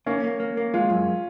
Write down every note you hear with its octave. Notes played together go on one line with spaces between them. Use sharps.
A#3 C#4
A#3
A#3
A#3
G#3 F4
F#2